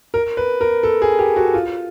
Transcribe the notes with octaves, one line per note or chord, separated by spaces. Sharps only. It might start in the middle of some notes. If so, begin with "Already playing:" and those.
A#4
B4
A#4
A4
G#4
G4
F#4
F4